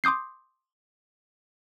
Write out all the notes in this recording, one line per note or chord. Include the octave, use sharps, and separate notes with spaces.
C6 D6 D#6 G6 C7